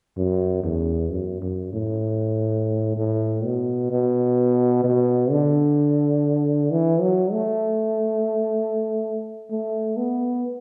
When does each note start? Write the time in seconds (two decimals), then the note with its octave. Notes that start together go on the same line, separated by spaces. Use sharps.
0.17 F#2
0.64 E2
1.11 F#2
1.42 F#2
1.73 A2
2.97 A2
3.44 B2
3.91 B2
4.84 B2
5.31 D3
6.71 E3
7.01 F#3
7.32 A3
9.51 A3
9.97 B3